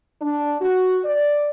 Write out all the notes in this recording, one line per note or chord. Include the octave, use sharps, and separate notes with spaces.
D4
F#4
D5